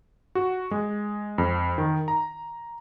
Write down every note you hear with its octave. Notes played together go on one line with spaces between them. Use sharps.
F#4
G#3
F2
D#3
A#5